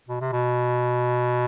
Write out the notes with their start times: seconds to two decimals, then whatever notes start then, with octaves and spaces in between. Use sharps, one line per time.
0.09 B2
0.20 C3
0.32 B2